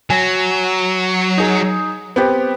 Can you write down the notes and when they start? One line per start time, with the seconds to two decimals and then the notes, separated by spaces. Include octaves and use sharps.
0.10 F#3 G#5
1.38 D#4 G#4
2.16 B3 C4 G4